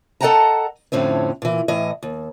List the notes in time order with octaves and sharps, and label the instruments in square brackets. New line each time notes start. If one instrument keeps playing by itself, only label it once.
[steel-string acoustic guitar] A4 D#5 F#5 G5 A5 A#5
F2 A2 D3 C4 C#4
A#2 E3
A2 E3 D#5
D#2